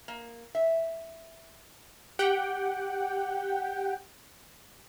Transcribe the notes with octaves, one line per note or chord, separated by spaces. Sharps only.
A#3
E5
G4 F#5 G5